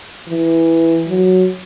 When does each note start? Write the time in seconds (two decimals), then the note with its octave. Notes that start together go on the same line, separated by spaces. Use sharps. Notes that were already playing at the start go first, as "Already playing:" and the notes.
0.29 E3
1.08 F#3